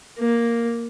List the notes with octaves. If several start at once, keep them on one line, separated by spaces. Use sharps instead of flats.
A#3